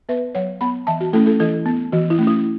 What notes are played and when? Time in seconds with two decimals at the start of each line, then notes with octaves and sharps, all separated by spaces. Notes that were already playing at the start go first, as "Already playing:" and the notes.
0.09 B3 B4 E5
0.35 F#3 C#5 F#5
0.61 B3 F#5 B5
0.87 E3 E5 A5
1.01 F#4
1.13 A3 C#4 E4 A4
1.26 E4 A4
1.40 E3 E4 A4
1.66 B3
1.92 E3 F#4
2.10 E4
2.19 A3 C#4
2.27 E4